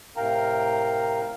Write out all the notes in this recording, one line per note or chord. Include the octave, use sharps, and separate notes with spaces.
A2 C3 A#4 F5 G5 A#5